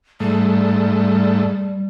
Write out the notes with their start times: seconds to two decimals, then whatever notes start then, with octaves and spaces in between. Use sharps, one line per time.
0.20 G#2 G3 A3